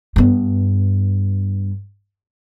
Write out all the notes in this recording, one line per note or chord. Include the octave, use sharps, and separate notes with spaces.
G2 B3